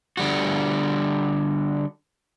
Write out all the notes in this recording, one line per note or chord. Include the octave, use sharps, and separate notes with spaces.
D3 G3 F#4